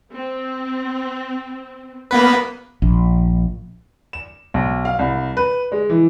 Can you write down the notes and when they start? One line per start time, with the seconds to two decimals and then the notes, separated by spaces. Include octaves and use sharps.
0.14 C4
2.11 A#3 B3 B4
2.82 A#1
4.13 E7
4.54 B1
4.85 F5
4.99 C2
5.37 B4
5.72 G#3
5.90 E3